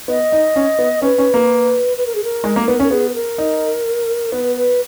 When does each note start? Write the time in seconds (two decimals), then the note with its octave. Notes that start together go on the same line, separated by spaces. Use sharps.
0.08 B3 D#5
0.32 D#4
0.56 C#4
0.79 B3
1.02 C#4 B4
1.18 C#4
1.34 A#3
1.97 B4
2.06 A#4
2.15 G#4
2.24 A#4
2.44 G#3
2.56 A#3
2.68 B3
2.80 C#4
2.84 A#4
2.91 B3 G#4
3.09 B4
3.14 A#4
3.38 D#4
4.32 B3 B4
4.55 B4